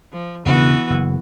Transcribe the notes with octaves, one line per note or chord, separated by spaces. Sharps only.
F3
E1 C#3 E3 B3 D4 F#4
F#1